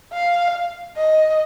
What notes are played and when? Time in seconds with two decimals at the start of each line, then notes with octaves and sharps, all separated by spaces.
0.13 F5
0.97 D#5